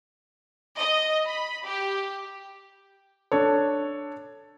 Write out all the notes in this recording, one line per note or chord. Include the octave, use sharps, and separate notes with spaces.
D#5
B5
G4
D4 A4 C#5